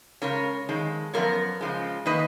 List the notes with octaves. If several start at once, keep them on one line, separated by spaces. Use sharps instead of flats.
C#3 G#3 C#4 A#4 C#5
F2 D#3 G#3
F#2 F3 B3 A#4 C#5
C#3 F3 G#3
D#3 A#3 B4 D#5